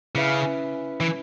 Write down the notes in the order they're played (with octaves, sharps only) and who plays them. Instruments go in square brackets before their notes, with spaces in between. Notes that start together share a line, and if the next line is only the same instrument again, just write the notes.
[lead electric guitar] C#3 [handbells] C#4 E4 B4 E5
[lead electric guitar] E3